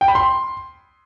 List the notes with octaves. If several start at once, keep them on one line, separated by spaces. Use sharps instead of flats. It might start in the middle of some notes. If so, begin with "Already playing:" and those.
G5
B5
C6